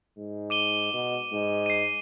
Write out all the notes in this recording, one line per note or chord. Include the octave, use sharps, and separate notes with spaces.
G#2
D6 D#7 G7
B2
G#2
C7 D#7